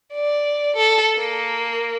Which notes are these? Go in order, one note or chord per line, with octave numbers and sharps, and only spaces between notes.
D5
A4
A#3